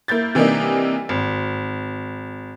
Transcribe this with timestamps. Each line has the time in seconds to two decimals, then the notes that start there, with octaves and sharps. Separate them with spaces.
0.08 A#3 E4 G6 A6
0.35 C3 E3 G3 A#3 D4 D#4
1.09 G#1